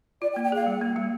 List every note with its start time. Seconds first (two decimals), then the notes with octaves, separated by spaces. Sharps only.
0.22 F4 D5
0.33 G5
0.36 A#3
0.44 G5
0.52 G#4 F5
0.67 G3
0.81 A#3
0.96 G3